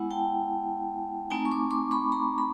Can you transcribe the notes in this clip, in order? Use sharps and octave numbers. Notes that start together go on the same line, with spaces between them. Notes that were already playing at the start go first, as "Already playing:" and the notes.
Already playing: G#3 B3 E4 F#5 G#5
G5 A5
A3 C4 D#4 G#5 A#5
C#6
C6 D6
C6 D6
B5 C#6
A#5 C6
B5